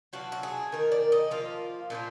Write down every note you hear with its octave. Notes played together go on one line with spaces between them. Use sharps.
F#3 B3 D4 F4 F#4
F#4
G#4
D#3 A#3 D#4 A#4
D5
D#5
F3 A#3 F4 F5
A#2 F3 A#3 F4